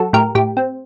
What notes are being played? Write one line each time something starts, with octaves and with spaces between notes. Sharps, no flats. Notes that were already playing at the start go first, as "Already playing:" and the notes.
Already playing: F#3 F#4 A4
A2 G4 A#4
A2 G4
C4